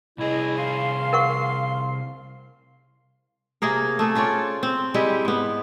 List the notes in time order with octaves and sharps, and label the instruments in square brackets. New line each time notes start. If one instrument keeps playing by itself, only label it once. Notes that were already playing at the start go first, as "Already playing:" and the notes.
[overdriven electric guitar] C2 G#4 [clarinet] E4 [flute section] D#5
[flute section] F5 [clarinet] C6
[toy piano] A#4 F#5 C#6
[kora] C3 A#3 G#4 A#4
A3 G#4 A4
C#4 F4 C#5 D5
C4
G3 G#3 E4 G4
G#2 B3